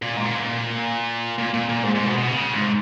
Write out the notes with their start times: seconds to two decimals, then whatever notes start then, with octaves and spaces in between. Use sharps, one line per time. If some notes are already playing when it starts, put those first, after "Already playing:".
0.02 A#2
0.17 G#2
0.25 A#2
1.38 A#2
1.54 A#2
1.69 A#2
1.84 G#2
1.95 G#2
2.06 B2
2.18 B2
2.29 C#3
2.52 G#2